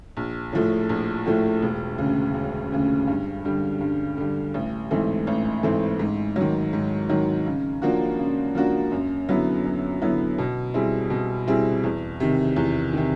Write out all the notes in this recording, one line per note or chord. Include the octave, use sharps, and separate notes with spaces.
A#1
A2 F3 A3
A#1
A2 F3 A3
E1
D2 C#3
E1
D2 C#3
G2
D3 G3
G2
D3 G3
A1
G#2 E3 A3 C4
A1
G#2 E3 A3 C4
G#2
D#3 F#3
G#2
D#3 F#3
C#3
F3 A#3 D4 F#4
C#3
F3 A#3 D4 F#4
F#2
D3 F#3 B3 E4
F#2
D3 F#3 B3 E4
B2
G3 C4 E4 G#4
B2
G3 C4 E4 G#4
E2
C3 D#3
E2
C3 D#3